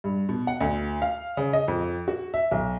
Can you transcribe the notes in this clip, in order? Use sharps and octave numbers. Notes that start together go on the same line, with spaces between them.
G2
B2
F#5
D2
F5
C#3
D#5
F2
F#4
E5
B1